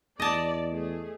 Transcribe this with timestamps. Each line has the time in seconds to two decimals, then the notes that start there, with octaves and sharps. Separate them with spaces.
0.20 E2 D5 D#5 A5
0.71 A3 G#4